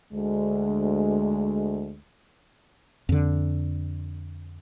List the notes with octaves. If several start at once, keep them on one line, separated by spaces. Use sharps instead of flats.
D2 G#3
F2 D3